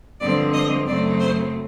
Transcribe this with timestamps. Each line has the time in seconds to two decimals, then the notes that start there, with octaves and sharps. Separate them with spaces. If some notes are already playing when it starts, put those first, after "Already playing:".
0.20 G2 D3 F3 G#3 C4 D5
0.53 D#5
0.86 F#2 C#3 F#3 A3 C4 D5
1.19 C5